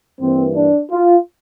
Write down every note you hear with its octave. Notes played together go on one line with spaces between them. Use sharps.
G2 E3 A#3 C4
D4
F4